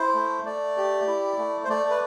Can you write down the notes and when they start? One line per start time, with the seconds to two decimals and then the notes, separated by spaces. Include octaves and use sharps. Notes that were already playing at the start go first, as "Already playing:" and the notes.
Already playing: E4 C5
0.15 A3
0.45 A3 D5
0.77 G4
1.07 E4
1.38 A3
1.64 C5
1.69 A3 D5
1.90 B4